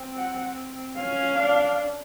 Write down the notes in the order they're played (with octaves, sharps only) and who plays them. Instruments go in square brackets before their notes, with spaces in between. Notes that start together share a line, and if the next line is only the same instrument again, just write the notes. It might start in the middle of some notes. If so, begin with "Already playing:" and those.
Already playing: [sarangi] C4
[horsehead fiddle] F#5
[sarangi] C#4 [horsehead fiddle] F5
[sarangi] D4